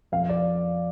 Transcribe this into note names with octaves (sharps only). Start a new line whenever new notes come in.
F2 F5
D5